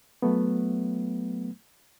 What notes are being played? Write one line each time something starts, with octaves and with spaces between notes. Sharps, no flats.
F#3 A3 B3